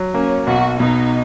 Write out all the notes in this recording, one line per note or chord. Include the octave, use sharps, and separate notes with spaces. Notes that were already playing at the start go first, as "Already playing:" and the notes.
Already playing: F#3
A#3 C#4
B1 F#4
B2 D#4